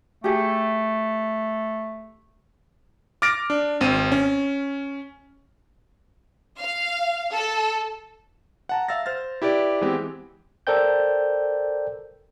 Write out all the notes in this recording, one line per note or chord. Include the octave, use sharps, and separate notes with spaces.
A3 G4 G#4
D6 F6 A6 A#6 D7
D4
G#1 C4 D#7
C#4
F5
A4
F#5 A5 A#5
E5 F5 E6 A6 A#6
C5 F6 A6
E4 G4 B4 D5
E3 G#3 B3 C4 G4
A4 A#4 C5 D5 G5 G6